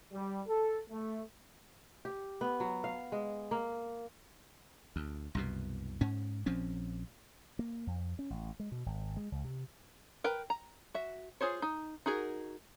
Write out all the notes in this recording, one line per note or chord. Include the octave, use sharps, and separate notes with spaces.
G3
A4
A3
G4
B3
F#3
F5
G#3
A#3
D2
C2 F#2 B2
G#2 C#4
A#1 F3 C4 C#4
A#3
F2
C#4
A1
G#3
B2
G#1
G#3
C#2
C3
A#4 B4 G5
A#5
F#4 E5
F4 G#4 C5 C#5
D#4
D#4 F#4 G#4 A#4